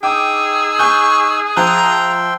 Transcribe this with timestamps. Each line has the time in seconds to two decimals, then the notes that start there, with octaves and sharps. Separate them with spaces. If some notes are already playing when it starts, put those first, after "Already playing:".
0.03 D#4 G#4 G5 D6 E6
0.79 G#5 C#6 F#6 G6
1.56 F3 E5 G5 A5 A#5 C6 F#6